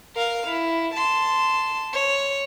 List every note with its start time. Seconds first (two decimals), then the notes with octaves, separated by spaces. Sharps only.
0.16 A#4 F5
0.47 E4
0.94 A5 C6
1.93 C#5